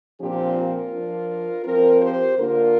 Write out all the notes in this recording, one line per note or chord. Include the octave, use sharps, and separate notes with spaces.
A#2 F3 C4 D4 G4
F4 A#4
F3 D4
F3 C4 F4 A#4
G4 C5
D3 A#3 D4 F4 A#4